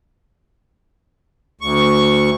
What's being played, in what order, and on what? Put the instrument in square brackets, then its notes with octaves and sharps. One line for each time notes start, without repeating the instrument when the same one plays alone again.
[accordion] D2 C#6